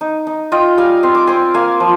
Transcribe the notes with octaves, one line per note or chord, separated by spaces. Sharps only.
D#4
D#4
F4 D#5 G5
G3 F5 G#5
C4 C6
D6
C4 G#5 C6
A#3 F5 G#5
F3